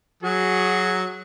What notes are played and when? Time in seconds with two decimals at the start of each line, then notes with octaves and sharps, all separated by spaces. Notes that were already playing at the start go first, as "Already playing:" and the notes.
0.23 F#3 F#4 G#4